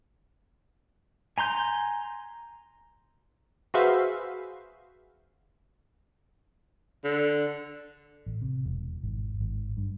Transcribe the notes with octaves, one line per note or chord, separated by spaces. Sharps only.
G#5 A#5 C6 G6
F#4 G#4 B4 C5 E5 F5
D3
A1
C3
E1
G#1
G#1
G2